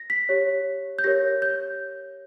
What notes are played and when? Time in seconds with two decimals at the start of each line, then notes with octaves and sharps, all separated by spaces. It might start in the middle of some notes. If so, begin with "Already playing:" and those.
Already playing: A#6
0.10 B6
0.29 G4 C#5
0.99 G6
1.04 G4 A#4 C#5 A#6
1.42 G6